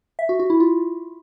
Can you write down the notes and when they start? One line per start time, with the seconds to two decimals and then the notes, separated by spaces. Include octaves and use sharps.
0.19 E5
0.29 F#4
0.39 F#4
0.50 E4
0.60 F4